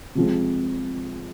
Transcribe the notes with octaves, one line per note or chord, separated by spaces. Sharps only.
C3 F3 G#3 C4